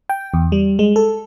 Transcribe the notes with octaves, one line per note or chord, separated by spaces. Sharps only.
G5
E2
G3
G#3
A4